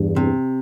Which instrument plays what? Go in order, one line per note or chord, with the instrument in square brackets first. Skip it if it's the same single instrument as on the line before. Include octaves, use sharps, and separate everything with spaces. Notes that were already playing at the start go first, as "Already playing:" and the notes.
Already playing: [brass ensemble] E2 G2
[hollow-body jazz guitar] C3